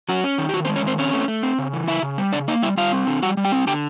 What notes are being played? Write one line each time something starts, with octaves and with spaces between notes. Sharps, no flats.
F#3 C#4 F#4
C#4
D#3
G4
D#3 F#3 F#4
C4 C5
G#3
C#4 C#5
D#3 C4 C5
C4 C#4 C#5
A3
A3
C4
C#3
E3
C#3 E4 E5
C#3
G3
C#3 D4 D5
A#3 D#4 D#5
G3 E4 E5
G3 F4 F5
C4
D3
G3 F#4 F#5
G3
G4 G5
C4
D3 G4 G5